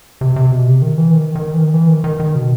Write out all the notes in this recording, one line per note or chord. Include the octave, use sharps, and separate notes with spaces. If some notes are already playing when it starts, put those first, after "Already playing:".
C3
C3
B2
C3
D#3
E3
D#3
D#3
E3
D#3
E3
D#3
D#3
D#3
B2